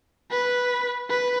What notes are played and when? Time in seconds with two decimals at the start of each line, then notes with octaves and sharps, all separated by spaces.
0.31 B4
1.10 B4